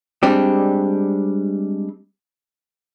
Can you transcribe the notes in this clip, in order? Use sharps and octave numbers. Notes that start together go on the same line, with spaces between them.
G3 G#3 C4 D4 G4